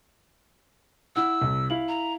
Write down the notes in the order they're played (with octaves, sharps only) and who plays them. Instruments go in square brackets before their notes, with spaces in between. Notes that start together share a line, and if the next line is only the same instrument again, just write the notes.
[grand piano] E4 F#5 [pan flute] E6
[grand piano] C2
E4 F5 F#7
[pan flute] A#5